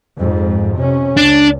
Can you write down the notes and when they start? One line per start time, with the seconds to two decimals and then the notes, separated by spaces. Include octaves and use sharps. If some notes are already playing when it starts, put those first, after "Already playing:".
0.16 F2 G#2
0.77 C3 C#4
1.17 C#2 D4